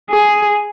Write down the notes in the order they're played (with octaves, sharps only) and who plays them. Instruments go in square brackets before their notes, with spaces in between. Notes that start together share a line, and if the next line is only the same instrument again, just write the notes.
[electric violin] G#4